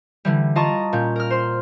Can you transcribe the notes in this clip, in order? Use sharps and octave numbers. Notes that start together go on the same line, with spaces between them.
D3 E3 G3
F4 D#5 A5 A#5 C#6
A#2 C#4 G6
A#4 F6
C5 C6